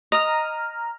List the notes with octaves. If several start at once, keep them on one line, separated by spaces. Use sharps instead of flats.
D#5 A#5 F6